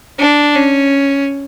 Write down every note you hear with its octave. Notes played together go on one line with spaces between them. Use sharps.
D4
C#4